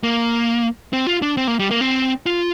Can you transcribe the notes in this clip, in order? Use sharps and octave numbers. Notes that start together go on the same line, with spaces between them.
A#3
C4
F4
D4
C4
A#3
G3
A#3
C4
F4